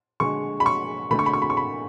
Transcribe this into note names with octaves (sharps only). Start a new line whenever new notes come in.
D3 G#3 C#6
B5
C#6
D3 A3 B5
C#6
B5
C#6
B5
C#6
B5